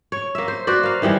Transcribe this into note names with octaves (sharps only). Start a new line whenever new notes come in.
C#5
A#3 E5
C5
F#4 B4 C5 D5
A#3 F5
D#3 E3 G3 G#3